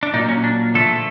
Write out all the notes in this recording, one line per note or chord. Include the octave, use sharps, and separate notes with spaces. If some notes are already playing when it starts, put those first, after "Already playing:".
D4
A#2 F#3 A#3 D#4
C#4
D4
D3 F3 A3 A4